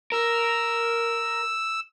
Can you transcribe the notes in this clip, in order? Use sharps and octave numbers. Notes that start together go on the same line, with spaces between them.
A#4 E6